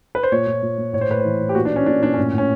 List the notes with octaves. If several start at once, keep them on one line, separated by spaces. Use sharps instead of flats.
B4
C5
A#2 C#5
A#2
A#2
A#2
A2 C#5
C5
A2 B4
C5
E3
E3
G4
A#2 F#4
D4
A#2
C#4
A#2 D4
A#2 D4
A2 C#4
A2 C#4